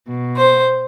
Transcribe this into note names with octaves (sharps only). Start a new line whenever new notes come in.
B2
C5